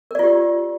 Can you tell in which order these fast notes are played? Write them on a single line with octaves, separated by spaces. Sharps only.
A#4 D5 F4 G4